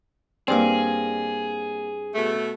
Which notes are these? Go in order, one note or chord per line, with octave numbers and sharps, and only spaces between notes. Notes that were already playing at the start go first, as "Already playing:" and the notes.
G2 A#3 C4 G#4 D5
B2 A3